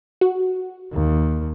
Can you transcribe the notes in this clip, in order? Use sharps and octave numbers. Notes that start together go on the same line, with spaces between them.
F#4
D#2